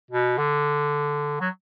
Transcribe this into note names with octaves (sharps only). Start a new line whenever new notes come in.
B2
D3
F#3